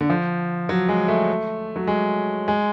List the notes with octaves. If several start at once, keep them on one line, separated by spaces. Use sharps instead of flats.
D3
F3
F#3
G#3
A3
F#3
G#3
G#3